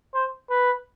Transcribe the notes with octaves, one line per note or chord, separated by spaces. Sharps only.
C5
B4